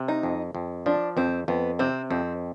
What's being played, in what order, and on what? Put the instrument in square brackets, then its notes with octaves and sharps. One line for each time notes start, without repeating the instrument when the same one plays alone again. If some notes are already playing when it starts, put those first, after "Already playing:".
Already playing: [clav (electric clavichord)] C3
[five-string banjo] D#4
[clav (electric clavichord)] F2
F2
[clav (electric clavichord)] F3 [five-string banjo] D4
[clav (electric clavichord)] F2 [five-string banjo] C4
[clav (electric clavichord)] F2 [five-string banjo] B3
[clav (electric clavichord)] C3 [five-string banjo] C4
[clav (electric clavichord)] F2 [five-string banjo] C4